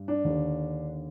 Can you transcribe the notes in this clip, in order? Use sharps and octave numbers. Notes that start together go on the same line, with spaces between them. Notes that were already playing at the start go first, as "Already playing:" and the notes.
Already playing: G2
D4
D#2 D3